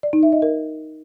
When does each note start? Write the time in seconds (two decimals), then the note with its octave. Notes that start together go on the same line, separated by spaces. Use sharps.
0.03 D5
0.13 D#4
0.23 E5
0.33 D#5
0.42 A#4